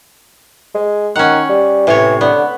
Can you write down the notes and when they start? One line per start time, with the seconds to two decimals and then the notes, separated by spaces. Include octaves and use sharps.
0.75 G#3
1.16 D#3 C#4 F#5
1.49 G3
1.87 A2 C3 E3 C#5
2.21 D3 B3